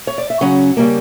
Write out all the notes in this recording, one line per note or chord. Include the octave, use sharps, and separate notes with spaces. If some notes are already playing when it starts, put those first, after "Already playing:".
C#5
D5
E5
C#3 F#3 C#4 F#5
C#3 G3 A#3